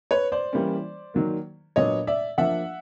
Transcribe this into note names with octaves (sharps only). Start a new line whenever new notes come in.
B4 C#5
C5 D5
E3 G3 A#3 C#4
D#3 F#3 A#3
A#2 F#3 B3 D4 C#5 D#5
D5 E5
F3 A#3 D4 E5 F#5